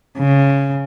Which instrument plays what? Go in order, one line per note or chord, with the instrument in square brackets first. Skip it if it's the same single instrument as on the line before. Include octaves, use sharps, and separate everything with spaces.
[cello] C#3